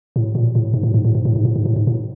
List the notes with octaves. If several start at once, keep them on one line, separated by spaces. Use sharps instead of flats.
A2
A#2
A2
G#2
A2
G#2
A2
G#2
A2
G#2
A2
G#2
A2
G#2
A2